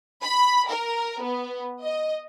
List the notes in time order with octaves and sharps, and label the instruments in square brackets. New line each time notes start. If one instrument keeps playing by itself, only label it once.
[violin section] B5
A#4
B3
D#5